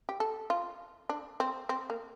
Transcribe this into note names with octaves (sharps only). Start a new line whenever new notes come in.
G4
A4
F4
D4
C4
C4
A#3